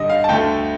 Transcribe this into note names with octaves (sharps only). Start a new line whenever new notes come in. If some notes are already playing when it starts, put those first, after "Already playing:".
Already playing: G2 D3 G3 D#5
F5
A5
D2 D3 A3 G5